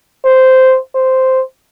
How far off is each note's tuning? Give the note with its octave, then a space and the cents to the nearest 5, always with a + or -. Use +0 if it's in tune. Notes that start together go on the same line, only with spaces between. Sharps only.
C5 -10
C5 -5